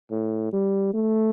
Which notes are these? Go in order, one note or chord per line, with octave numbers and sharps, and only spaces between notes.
A2
G3
A3